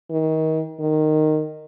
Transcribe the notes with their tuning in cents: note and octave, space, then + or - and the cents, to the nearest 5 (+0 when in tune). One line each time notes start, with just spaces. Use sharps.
D#3 +30
D#3 -10